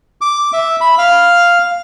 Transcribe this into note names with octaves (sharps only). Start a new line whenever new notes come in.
D6
E5
B5
F5